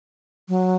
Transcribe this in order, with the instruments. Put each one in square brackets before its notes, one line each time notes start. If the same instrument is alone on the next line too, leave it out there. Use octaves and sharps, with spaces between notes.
[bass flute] F#3